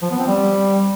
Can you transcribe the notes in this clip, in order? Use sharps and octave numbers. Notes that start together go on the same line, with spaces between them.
F3
B3
C4
G3